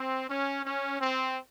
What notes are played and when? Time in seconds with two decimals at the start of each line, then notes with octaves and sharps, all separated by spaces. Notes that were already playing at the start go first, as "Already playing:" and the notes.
Already playing: C4
0.29 C#4
0.63 C#4
0.98 C4